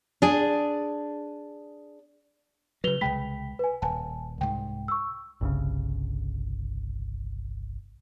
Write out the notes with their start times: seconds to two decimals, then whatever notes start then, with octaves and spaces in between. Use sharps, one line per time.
0.22 D4 G#4
2.84 C#3 F#3 B4 F7 G7
3.01 C2 C#3 G#3 G5 B5 B6
3.59 B4 G#5
3.82 D#1 G#5 A5
4.41 C2 G#2 G5
4.88 C#6 E6
5.41 G1 C2 C#3